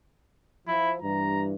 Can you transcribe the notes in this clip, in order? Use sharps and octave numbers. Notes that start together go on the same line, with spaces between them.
F3 E4
G2 E3 A#5